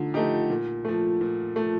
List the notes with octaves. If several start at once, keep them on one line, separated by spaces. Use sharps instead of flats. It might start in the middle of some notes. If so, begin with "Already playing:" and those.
Already playing: D3 F3 A3 D#4
F3 A3 D#4 G4
A#2
F3 A3
A#2
F3 A3